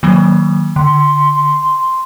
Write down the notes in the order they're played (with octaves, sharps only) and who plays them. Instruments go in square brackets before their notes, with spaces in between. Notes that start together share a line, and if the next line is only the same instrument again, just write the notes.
[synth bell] D#3 F#3 A#3
[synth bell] D3 [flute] C6